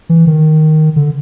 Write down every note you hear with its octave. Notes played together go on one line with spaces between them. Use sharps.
E3
D#3
D3